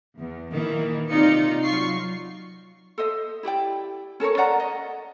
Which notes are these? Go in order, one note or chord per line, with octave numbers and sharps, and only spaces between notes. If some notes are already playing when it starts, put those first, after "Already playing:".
E2
A#2 D#3 E3 A#3
C3 D#4 F4 D5 C#7
F#3 F4 C#6 C7
A4 C5 D#5 E5
E4 G4 D5 G5
C#4 A4 A#4 C#5
A#4 D5 F#5 A#5
D#5